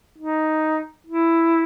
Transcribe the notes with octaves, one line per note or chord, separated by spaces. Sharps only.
D#4
E4